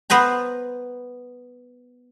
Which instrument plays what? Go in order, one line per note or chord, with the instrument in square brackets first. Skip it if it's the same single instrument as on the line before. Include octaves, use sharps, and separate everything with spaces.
[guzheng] B3 B4 C5 A#5